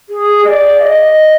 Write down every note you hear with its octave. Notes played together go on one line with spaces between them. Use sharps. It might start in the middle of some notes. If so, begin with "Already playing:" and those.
G#4
D#5
D5
F5
D#5